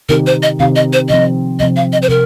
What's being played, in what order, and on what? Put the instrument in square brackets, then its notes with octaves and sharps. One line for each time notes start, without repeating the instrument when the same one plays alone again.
[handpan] C3 D#3 C4 D#4 G4 [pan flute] A#4
[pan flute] C5
D#5
[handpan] C3 D#3 C4 D#4 G4 [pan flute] F5
[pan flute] D#5
C5
[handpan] C3 F3 C4 [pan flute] D#5
[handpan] C3 F3 C4 [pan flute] D#5
[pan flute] F5
D#5
C5
[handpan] C3 [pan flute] A#4